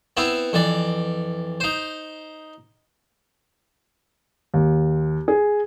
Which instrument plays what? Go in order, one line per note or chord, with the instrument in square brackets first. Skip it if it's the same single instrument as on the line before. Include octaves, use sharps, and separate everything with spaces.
[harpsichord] B3 C4 E4
F2 E3 D5
D#4 C5
[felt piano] D#2
G#4